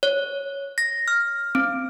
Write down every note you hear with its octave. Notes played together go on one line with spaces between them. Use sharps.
C#5
A#6
F6
C4